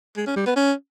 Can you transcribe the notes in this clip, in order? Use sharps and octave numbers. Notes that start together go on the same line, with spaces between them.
G#3
C#4
G3
B3
C#4